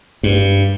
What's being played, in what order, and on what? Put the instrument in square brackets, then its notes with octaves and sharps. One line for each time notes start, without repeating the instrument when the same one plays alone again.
[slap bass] G2